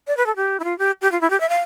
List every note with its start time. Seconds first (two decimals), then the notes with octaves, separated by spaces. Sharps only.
0.07 D5
0.17 B4
0.26 A4
0.36 G4
0.60 E4
0.64 F4
0.79 G4
1.02 G4
1.12 F4
1.21 E4
1.30 G4
1.40 E5
1.49 F5